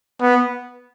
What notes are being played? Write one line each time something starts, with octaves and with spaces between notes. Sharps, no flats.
B3